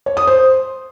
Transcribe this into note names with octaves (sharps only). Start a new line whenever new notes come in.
C#5
D#6
C5